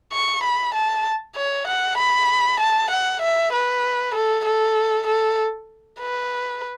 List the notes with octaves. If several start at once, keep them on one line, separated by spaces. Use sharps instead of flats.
C#6
B5
A5
C#5
F#5
B5
A5
F#5
E5
B4
A4
A4
A4
B4